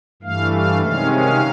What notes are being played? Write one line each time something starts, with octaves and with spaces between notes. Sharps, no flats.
G2 E3 A3 F5
F5
C3 D#3 G#3 C#4 F5
F5